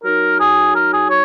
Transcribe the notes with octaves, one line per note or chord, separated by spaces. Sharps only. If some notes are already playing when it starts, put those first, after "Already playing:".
F#3 D#4 A#4
G#4
A#4
G#4
C#5